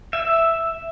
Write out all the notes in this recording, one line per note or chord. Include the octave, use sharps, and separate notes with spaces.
E5